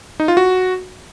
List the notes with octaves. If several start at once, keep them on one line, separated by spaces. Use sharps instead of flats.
D#4
F4
F#4